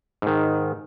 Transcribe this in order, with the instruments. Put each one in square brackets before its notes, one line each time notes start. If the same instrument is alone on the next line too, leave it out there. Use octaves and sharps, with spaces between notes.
[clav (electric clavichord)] G#2 D#3